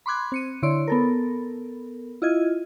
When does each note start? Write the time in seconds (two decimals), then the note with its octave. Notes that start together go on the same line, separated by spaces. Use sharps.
0.06 B5 C6 D6 F#6 G#6
0.32 C4 C#7 D#7
0.62 D3 E4 C#5 C6 D7
0.87 B3 A4 A#4
2.22 E4 F4 D#5 G#6